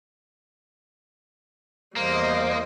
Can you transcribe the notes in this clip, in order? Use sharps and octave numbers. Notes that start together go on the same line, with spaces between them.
E2 G3 A#3 C5 D#5 D#6